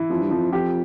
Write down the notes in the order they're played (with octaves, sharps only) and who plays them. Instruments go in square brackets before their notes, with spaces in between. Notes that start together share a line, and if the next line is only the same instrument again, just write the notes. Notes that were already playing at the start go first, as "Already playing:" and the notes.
Already playing: [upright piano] E3
[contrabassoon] F2 [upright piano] F3
[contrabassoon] G2
[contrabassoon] F2 [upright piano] F3
[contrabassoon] F2 [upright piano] G4